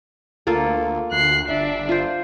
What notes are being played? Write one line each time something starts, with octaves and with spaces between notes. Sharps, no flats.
D2 A#3 F4 A4
D2 F#6 C7
G1 D4 E5
F4 C5